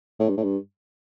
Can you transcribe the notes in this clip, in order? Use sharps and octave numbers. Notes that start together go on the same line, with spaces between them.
A2
G2
A2
G2